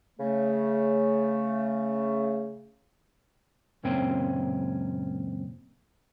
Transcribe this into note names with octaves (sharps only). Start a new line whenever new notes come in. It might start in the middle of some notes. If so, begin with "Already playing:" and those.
C#3 A3
C#2 F#2 A#2 C4 C#4 G5